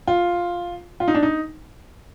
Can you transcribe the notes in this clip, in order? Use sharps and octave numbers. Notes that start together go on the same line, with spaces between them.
F4
F4
D#4
D4
D#4